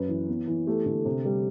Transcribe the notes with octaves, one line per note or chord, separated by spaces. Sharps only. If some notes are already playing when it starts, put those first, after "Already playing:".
Already playing: F#2 B4
E3
B3
E3
A3 G4
D3
C3
G3